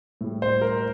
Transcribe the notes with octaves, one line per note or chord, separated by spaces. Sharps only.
A2 G3
C5
A#4